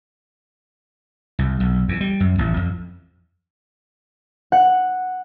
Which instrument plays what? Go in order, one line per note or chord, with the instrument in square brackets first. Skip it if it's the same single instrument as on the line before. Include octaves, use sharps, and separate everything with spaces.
[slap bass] C2
B1
E2
G3
F#2
A1
F2
[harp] F#5